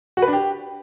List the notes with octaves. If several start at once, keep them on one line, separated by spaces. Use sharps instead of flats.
F#4
B4
D4
G4